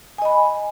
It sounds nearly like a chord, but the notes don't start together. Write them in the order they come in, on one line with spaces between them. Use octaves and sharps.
G#5 D#5 B5